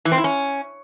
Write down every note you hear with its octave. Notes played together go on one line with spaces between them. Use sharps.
E3
C4
E4
C#4